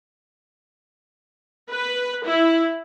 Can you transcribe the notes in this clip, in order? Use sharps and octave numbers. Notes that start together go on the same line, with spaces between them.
B4
E4